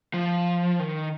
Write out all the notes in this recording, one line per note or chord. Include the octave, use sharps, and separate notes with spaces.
F3
D#3